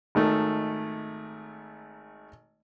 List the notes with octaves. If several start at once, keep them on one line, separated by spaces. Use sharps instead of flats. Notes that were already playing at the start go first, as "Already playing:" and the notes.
G#1 D#3 A3